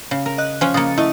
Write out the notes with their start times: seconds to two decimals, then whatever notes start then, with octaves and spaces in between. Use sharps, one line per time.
0.11 C#3
0.26 A#4
0.38 D#5 F#6
0.61 F3 C#4 G#5
0.74 C#3 A#3 D#6 A6 C#7
0.98 A3 E4 D#5